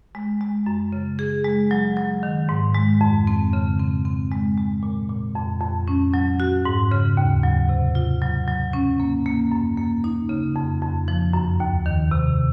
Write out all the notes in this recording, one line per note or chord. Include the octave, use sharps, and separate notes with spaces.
G#3
G#3
F#2
C#3
G#4
G#3
F#3
F#3
D#3
G#2
G#3
F2
C4
C#3
C4
C4
G#3
G#3
A#2
A#2
F2
F2
C#4
F#3
F#4
G#2
C#3
D#2
F#3
C3
F4
F#3
F#3
C#4
A#3
A#3
F#2
A#3
D#4
C#3
F2
F2
F3
F#2
D#2
D#3
C3